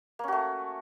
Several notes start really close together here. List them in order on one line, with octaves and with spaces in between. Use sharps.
A#3 C#4 F#4 A3